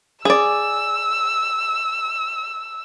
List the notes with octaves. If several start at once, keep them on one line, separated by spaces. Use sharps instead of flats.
G#4 D5 E6